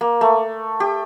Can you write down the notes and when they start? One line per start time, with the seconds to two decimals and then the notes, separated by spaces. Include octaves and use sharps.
0.01 A#3
0.21 A3
0.80 G4